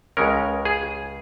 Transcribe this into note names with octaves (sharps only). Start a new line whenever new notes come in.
C#2 C#3 G#3 C#4 A#4
G#4